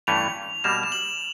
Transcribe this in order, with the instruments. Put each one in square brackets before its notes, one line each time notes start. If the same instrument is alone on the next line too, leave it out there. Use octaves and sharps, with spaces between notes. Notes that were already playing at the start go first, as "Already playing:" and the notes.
[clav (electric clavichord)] G2 E3 A3 C#4 [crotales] F7
[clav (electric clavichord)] B2 G3 A#3 [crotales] E7
[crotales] E7
F#7